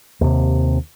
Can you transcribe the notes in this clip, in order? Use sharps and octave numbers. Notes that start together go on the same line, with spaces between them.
D#2 C3